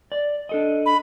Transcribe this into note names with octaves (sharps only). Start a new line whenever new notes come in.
D5
D4 A4 D#5
B5